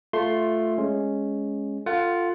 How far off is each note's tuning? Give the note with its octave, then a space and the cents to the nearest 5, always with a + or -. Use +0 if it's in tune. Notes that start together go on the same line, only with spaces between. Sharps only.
A3 +0 F4 +0 C6 +10
G#3 +0 C#4 +0
F4 +0 A4 +30 F#5 +20